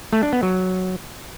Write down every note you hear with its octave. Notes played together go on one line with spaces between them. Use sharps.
A3
D4
B3
F#3